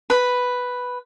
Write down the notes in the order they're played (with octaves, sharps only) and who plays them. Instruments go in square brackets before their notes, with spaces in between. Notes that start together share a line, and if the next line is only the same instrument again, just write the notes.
[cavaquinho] B4 B5